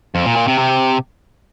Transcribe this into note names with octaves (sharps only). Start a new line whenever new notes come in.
F2
A#2
A#2
C3
C3